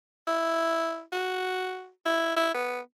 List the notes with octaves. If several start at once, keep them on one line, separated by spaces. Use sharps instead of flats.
E4
F#4
E4
E4
B3